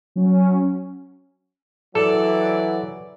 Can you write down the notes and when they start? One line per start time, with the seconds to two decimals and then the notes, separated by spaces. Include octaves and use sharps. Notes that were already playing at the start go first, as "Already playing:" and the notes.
0.16 F#3 C#4
1.95 E3 F#3 A4 D5